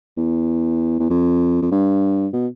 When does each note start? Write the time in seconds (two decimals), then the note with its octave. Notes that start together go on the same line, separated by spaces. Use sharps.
0.17 E2
1.00 E2
1.10 F2
1.62 F2
1.71 G2
2.33 B2